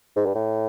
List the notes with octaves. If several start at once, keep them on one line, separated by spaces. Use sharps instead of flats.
G#2
G2
A2